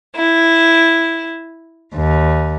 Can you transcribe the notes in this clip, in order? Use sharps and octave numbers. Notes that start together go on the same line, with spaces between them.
E4
D#2